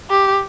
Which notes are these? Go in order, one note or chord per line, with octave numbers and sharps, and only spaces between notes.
G4